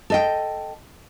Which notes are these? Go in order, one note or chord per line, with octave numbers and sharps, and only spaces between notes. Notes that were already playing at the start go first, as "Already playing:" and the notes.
A4 D#5 G5